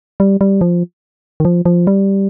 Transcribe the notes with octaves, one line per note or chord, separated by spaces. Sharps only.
G3
G3
F3
D#3
F3
F3
G3